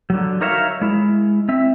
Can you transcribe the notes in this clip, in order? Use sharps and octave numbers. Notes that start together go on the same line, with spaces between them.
D3 F#3
D#4 A#4 C#5 E5 F5
G#3 E4
C4 E5